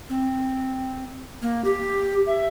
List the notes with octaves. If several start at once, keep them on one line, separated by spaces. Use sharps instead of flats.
C4
A#3
G4
E5